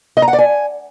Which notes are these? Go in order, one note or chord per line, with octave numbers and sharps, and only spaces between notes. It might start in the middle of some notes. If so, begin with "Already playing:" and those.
D#5
A#5
F#5
D5
G#5